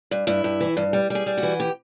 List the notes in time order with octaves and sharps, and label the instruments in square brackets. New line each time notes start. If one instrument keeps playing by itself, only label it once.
[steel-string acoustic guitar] G2
G2 E4
G2
E3
G2
G3
G3 G#4
G3
F#4
E3
G4